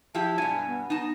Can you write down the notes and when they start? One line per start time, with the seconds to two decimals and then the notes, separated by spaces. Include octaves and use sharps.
0.15 F3 E4 G4 A5
0.38 G2 B2 G#5
0.67 B3
0.90 D#4 A5